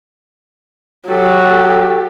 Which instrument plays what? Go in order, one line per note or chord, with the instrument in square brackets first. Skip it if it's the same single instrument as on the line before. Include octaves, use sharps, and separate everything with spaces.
[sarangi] F#3 [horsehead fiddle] G4 A4